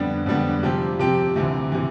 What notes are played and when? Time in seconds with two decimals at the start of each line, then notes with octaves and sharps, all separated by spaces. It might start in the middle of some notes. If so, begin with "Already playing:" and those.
Already playing: F2 D3 G3 B3 D4
0.26 F2 D3 G3 B3 D4
0.63 C3 F3 C4 G4
0.99 C3 F3 C4 G4
1.36 D2 C3 E3
1.72 C3 E3